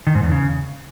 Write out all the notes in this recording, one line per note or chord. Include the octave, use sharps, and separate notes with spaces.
D#3
G#2
E2
C#3